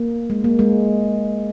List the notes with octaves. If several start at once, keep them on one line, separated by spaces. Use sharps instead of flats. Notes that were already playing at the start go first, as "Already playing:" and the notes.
Already playing: A#3
G#3
A#3
G#3